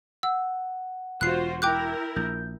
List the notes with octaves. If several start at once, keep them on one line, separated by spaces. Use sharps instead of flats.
F#5 E6
E1 F4 F#4 C5 F#6 C7
E4 A#4 G5 D6 F#6 G6
A#1 G6